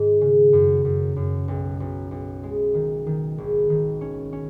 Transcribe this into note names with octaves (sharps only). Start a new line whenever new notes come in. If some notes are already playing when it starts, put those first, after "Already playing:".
Already playing: G#2 D#3
C#3
F#2
F#2
F#2
B1
B1
B1
G#3
D#3
D#3
G#1
D#3
C#4
C#4